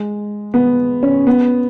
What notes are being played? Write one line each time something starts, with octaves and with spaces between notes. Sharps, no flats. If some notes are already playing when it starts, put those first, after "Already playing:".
Already playing: G#3
B3
C#4
B3